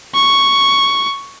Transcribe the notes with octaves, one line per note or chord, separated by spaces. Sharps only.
C#6